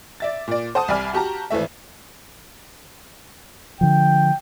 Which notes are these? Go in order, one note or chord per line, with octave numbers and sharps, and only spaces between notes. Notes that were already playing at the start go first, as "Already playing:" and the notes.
D5 E5 A6
A#2 D5
C5 F#5 A5 D#6
C2 G3 D5 G#5 B5 F6
F#4 G4 A5 A#5
G#1 E3 A3 E5
D3 F3 G5